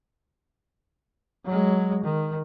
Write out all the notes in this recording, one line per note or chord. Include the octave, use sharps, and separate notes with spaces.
F#3 G#3
D#3